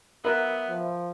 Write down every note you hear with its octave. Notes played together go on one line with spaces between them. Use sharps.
F#3 B3 A#4 B4 E5 B5
F3